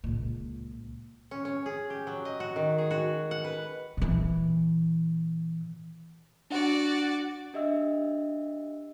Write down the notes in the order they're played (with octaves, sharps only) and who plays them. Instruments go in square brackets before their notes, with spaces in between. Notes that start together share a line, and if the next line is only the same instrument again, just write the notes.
[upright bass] C#2 A#2
[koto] C#4
C#4
G#4
G4
F#3
D#5
F#4
D#3
G#4
F#4
F#5
B4
[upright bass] A#2 E3
[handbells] D4 F#5 [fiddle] F#4 D5
[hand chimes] D4 G4 D#5 E5 E6